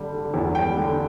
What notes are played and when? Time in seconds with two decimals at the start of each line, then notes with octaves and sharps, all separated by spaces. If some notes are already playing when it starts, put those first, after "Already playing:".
Already playing: D3 G3
0.13 D3
0.34 E2
0.55 G3 G5
0.76 D3